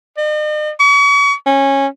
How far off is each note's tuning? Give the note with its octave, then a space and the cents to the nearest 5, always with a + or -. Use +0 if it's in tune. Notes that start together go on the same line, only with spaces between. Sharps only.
D#5 -45
C#6 +40
C#4 -15